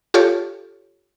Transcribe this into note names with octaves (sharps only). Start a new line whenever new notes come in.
F4 G4 A4 C#5